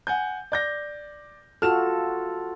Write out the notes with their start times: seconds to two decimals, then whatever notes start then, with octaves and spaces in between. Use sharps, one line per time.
0.07 F#5 G#5 G6
0.52 D5 G6 A#6
1.62 F4 F#4 A4 F6 E7